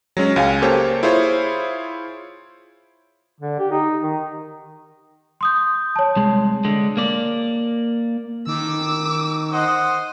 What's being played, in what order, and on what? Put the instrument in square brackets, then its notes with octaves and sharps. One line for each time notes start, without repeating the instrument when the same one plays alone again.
[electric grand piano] F#3 G#3 C#4
C#2 F5 G#5
A#3 G4 A4 C5 C#5
E4 F4 G#4 C5 C#5
[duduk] D3
G4
D#4
D#3
[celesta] C6 D#6 G6
C#5 A5
[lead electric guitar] C2 G#3
D3 G#3
A#3 D5
[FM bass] D#3 [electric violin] D6 E6
[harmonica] C5 D#5 F#5